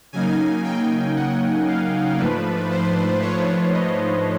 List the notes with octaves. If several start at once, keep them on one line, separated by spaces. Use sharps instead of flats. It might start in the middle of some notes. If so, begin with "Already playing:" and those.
C#3 F#3 A#3 D#4 G#5
G5
F#5
F5
G#2 F3 A3 D4 B4
C5
C#5
D#5